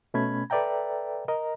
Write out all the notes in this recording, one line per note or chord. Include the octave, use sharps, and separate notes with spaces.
B2 A3 C#4 B5 G#6
A4 B4 D5 E5 G5 A#5
A#4 D#5 A#5